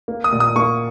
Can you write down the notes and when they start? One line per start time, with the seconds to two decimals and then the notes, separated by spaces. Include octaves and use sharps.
0.08 A#3
0.24 D#6
0.32 A#2
0.40 D#6
0.56 A#3 C#6